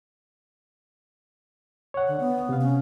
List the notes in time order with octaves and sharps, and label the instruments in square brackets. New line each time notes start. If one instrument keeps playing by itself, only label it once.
[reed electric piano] C#5 F#5
[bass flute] D3
B3
[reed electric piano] C3 F5
[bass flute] C#4